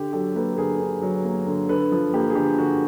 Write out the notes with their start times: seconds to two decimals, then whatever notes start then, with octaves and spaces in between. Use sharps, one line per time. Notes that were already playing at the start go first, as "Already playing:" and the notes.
Already playing: D3 G4
0.13 F#3 G4 A4
0.35 A#3 A4 B4
0.53 A4
0.58 D3 G#4 A#4
0.80 D3
1.02 F#3
1.24 A#3
1.47 D3
1.69 D3 A4 B4
1.92 F3
2.14 A#3 G4 A4
2.30 G#4
2.35 D3 G4
2.58 D3 F#4